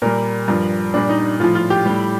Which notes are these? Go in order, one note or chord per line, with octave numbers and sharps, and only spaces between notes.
A#2 G3 A#4
G2 F3
A#2 G3 D4
D#4
A2 F3 F4
F4
G4
A2 G3